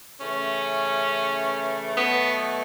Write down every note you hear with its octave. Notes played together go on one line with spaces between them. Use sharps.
C#3 E3 A3 C#4
B2 F#3 A3 B3